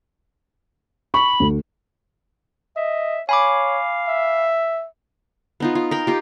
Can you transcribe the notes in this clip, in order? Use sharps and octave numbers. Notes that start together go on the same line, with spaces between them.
B5 C#6
D2
D#5 E5
C#5 F5 G#5 B5 D6
E5
B3 D#4 F4
F4
A#4 G5
D#4 F4 G4